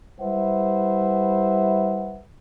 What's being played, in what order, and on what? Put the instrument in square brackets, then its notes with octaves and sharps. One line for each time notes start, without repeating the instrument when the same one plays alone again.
[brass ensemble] G3 E4 B4 C5 E5 F#5